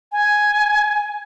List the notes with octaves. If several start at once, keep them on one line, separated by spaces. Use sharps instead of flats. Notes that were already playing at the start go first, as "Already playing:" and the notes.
G#5